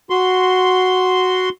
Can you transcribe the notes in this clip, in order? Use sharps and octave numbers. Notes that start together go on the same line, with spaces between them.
F#4 C6